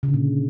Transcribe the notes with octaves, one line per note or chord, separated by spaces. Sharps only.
C#3
D3
A#2